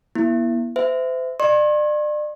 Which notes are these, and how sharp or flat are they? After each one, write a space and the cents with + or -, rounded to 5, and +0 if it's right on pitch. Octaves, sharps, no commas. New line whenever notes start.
B3 -45 E4 +0
C5 -35 E5 +0
D5 +35 C6 +45